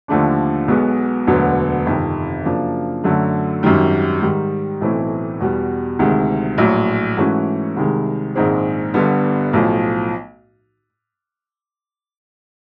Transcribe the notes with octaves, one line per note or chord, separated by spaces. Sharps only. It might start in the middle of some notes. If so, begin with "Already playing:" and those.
D#2 D3 F3 A3 D4
B1 B2 G#3 B3
E1 D2 D3 F#3 B3
G1 F2 C3 D#3
F#2 C#3 F3 A#3 D4
F#2 D3 F#3 A3
G#1 F#2 D#3 G3
G#2 D#3 G3
B1 A2 E3 A3 C4
E2 B2 G3
D2 C3 D#3 G#3
A#1 A2 F#3
G#2 E3 A3 C#4 F#4
C2 C3 D#3 G#3
A#1 G#2 D#3 G#3 C4
G1 G2 D3 G3 B3
B1 A2 F3